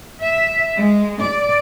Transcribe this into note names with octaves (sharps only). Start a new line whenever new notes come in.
E5
G#3
D5